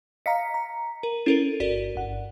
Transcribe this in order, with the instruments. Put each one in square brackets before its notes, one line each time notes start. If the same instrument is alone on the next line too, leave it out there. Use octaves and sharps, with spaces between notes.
[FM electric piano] D#5 F5 A#5 [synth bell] B6 C#7
[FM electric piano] A#5
[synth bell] A#4
[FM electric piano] C#4 [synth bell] E4 A4 A#4
[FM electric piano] G1 [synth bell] F#4 A#4 D5
[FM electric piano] G1 F#5